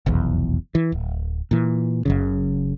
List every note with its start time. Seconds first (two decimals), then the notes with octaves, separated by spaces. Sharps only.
0.06 F1 B1 E2
0.75 E3
0.92 D1
1.51 A#2 E3
2.05 F#1 F#2 C#3